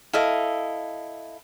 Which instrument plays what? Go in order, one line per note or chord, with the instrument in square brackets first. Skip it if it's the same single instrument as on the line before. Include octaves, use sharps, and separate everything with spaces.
[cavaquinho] E4 A4 D#5 F5